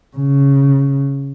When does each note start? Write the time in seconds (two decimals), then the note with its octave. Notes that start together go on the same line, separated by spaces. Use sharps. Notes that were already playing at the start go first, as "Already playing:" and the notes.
0.16 C#3